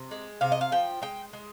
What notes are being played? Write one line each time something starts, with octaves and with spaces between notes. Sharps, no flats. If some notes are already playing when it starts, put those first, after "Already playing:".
Already playing: C3
G#3
C3 F5
D#5
F5
F3 G5
G#3 G5
G#3